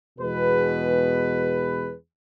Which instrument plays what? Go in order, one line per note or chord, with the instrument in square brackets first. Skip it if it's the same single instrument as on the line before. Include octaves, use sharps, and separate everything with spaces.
[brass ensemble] E2 B2 G#3 G#4 B4